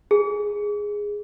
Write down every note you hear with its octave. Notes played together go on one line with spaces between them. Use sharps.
G#4